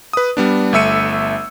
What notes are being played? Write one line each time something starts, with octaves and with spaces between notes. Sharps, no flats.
B4 D#6
G3 B3 D4
G1 A3 E5 E6 C#7 D#7